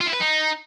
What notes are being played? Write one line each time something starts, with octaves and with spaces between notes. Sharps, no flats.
F4
E4
B4
D#4